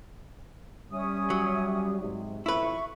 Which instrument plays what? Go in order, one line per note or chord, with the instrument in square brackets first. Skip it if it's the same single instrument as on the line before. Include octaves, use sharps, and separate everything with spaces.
[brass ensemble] G3 [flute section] C#4 E5 D#6
[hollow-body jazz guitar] F#3
[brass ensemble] G#2 C3
[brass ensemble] B1 F2 A2 [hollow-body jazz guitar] E4 B4 [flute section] E5 C#6